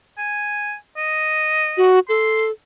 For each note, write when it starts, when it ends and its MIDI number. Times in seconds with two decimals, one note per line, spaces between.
0.18 0.74 80
0.97 1.92 75
1.77 1.99 66
2.09 2.51 69
2.09 2.44 84